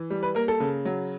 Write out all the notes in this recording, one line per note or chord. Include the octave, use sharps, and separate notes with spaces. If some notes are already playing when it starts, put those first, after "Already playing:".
Already playing: E3
G3
B4
A#3 A#4
A4
C#3
F#3